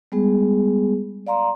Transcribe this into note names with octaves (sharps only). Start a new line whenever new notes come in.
G3 G#3 B3 G#4
D5 F5 A#5 C6